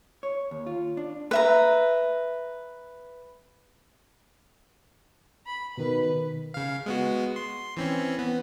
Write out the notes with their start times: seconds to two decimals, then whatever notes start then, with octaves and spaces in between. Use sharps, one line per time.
0.23 C#5
0.51 D#2
0.67 F4
0.97 D4
1.31 B4 E5 A#5
5.46 B5
5.78 B2 D#3 B4
6.54 C#3 F5
6.86 G#3 B3 F#4
7.36 C6
7.77 E3 C4 C#4
8.19 B3